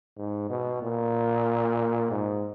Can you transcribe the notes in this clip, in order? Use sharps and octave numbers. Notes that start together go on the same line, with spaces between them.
G#2
B2
A#2
G#2